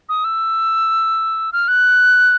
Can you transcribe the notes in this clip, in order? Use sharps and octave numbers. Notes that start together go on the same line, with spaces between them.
D#6
E6
F6
F#6